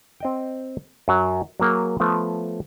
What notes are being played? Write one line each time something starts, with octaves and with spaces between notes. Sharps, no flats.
C4 D#5 G5
F#2 F#3
F#3 A#3 G#4
F3 A3 B3